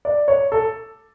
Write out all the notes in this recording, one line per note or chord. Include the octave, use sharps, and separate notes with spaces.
D5
C#5
A4